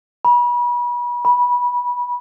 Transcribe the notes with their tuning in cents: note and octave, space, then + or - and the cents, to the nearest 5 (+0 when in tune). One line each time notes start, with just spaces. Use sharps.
B5 -35
B5 -20